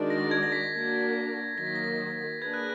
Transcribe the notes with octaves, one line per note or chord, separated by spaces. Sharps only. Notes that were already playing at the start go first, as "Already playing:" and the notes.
Already playing: D#3 G#3 D4 F#4 D5
A#6
G#6
A#6
B6
A#3 D4 F#4 A#4
D#3 F#3 A#3 A#6
B6
A#6
A#3 D4 G#4 B4 G#6
F#6